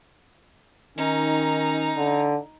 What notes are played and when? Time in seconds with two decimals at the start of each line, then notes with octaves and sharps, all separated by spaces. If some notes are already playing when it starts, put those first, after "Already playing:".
0.98 D#3 C#4 D#4 A#5
1.97 D3